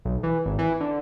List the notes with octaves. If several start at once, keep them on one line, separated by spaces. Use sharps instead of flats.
B1
E3
G#1
E3
D3